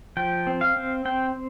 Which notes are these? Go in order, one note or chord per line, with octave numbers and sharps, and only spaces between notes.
F3 G5
C4
F5
C4
C4 G5